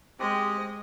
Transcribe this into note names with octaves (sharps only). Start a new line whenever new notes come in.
G#3 C4 G4 D#5